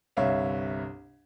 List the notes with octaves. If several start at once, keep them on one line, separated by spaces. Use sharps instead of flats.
G1 C2 C#5 E5 F5